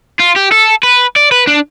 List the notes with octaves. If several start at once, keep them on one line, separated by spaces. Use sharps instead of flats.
F4
G4
A4
B4
D5
B4
D4